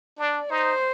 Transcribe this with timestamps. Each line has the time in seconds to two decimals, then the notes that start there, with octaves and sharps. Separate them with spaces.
0.18 D4 D5
0.50 D#4 C5